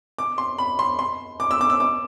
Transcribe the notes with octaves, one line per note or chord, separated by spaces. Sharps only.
D6
C6
B5
C6
C6
D6
E6
D6
E6
D6